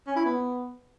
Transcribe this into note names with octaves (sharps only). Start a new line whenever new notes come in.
C#4
E4
B3